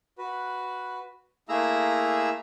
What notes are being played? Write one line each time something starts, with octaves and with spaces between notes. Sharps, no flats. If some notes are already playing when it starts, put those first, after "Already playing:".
F#4 B4
A3 A#3 E4 G#4 A#5 E6